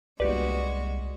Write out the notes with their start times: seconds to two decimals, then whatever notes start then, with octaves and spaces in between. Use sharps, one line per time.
0.20 G1 C2 G#3 A#3 F#4 G4 B4 D5